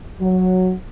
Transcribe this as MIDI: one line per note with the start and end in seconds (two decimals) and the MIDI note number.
0.20 0.72 54